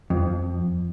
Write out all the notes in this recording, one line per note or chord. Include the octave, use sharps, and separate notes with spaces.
F2